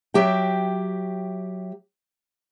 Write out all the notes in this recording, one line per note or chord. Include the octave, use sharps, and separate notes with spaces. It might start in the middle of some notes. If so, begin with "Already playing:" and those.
F#3 G4 E5 G5